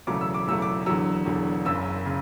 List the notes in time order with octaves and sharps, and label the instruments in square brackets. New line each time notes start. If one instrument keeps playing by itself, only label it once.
[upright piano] E1 E2 C#3 F#3 A3 D6
E6
D6
E1 E2 C#3 F#3 A3 E6
D6
E1 E2 D3 F#3 E6
E1 E2 D3 F#3
F#1 F#2 C#3 E6
C#3